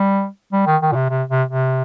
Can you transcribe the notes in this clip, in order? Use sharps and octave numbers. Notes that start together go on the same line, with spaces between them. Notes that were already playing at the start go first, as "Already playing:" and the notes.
Already playing: G3
G3
D#3
D#3
A#2
C3
C3
C3
C3